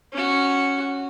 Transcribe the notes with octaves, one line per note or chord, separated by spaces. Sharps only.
C#4 F#4